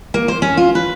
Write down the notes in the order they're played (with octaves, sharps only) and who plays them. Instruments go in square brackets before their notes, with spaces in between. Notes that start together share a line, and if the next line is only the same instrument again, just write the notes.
[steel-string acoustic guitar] A#3
C5
C#4
F4
B4